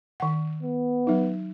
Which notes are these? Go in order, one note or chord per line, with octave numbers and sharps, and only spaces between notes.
D#3 F#5
B3
F#3 D#4